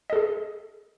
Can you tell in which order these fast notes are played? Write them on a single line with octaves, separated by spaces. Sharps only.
D#5 A4 G#4